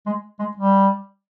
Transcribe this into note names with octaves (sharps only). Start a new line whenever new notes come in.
G#3
G#3
G3